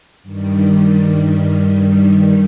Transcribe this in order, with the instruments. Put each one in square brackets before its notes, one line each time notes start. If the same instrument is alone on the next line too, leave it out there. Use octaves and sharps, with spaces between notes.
[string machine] G2 D#3 G3